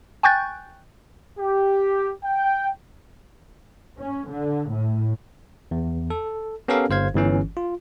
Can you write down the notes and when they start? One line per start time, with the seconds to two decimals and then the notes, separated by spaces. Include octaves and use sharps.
0.23 G5 G#5 C#6 F#6 G6 A6
1.39 G4
2.25 G5
4.00 C#4
4.31 D3
4.73 A2
5.71 E2
6.10 A4
6.68 B3 C#4 G4 A4 A#4 F5
6.90 G1 C5 F5 G#6
7.15 G1 E3 C#4
7.57 F4